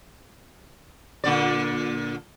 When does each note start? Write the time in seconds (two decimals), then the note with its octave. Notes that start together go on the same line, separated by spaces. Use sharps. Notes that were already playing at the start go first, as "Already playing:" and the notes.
1.24 A#2 D3 D5